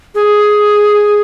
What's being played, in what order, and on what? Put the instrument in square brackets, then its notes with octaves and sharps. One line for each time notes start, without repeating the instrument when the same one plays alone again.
[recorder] G#4